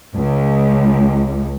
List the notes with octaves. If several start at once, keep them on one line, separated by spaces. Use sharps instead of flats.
C#2